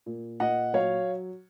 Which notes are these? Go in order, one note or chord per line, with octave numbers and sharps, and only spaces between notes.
A#2
A#2 D#5 F#5
F#3 C#5 F5